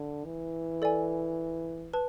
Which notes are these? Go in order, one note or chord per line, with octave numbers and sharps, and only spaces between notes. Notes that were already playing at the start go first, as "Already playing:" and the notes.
Already playing: D3
E3
A4 D5 G#5
B4 A5